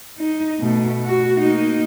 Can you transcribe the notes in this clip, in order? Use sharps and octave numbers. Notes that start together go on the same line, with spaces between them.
D#4
B2 A3
F#4
A#3 D#4